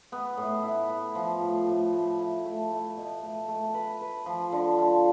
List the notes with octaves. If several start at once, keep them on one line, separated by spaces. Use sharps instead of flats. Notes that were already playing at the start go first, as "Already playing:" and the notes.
B3
A2
E4
B3
F3
A2
A2
A2
E4
A3
A3
B2
A3
A3
B4
B4
F3
D3
F4